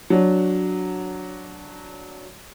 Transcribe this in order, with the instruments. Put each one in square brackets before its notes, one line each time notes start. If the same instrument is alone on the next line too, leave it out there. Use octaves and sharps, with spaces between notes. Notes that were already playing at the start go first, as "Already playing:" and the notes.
[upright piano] F#3 D4